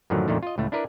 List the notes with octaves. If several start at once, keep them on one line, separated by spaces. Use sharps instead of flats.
F#2 A2 D3 D#3 F3 F#3
F2 A#2 D3 D#3 A3
F4 D#5
C#2 A2 A3
D4 E4 A#4 B4 D5